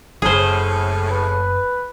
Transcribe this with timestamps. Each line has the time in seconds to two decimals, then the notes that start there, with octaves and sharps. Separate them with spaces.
0.22 F#1 A2 C#3 G#4 C5
1.11 B4